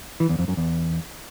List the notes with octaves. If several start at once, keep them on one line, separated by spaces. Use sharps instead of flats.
E3
E2
F2
F#2
E2